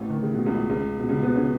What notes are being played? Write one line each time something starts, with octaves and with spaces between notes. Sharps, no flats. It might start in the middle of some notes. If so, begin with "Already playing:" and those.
Already playing: A1 A2
D#3
C#3
B2
C#2 C#3
C#2 C#3
B2
C#2 C#3
B2 B3
C#3 C#4